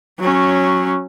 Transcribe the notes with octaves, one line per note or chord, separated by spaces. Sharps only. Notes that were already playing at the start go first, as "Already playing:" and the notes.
F#3 C#4